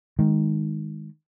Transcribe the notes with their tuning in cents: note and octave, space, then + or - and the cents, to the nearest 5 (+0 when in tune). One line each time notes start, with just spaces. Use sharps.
D#3 +0 G#3 +0